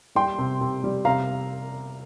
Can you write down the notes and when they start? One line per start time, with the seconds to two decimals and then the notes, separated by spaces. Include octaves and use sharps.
0.15 G3 G5 C6
0.38 C3
0.61 C3
0.84 G3
1.05 C3 F5 A#5